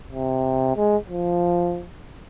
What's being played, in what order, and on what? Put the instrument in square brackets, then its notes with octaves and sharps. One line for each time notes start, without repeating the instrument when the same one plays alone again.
[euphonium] C3
G#3
F3